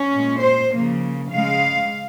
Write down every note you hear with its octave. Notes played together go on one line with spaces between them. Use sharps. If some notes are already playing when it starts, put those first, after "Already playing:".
Already playing: C#4
A#2 G#3
C5
C#3 F3 A#3
C#3 G#3 F5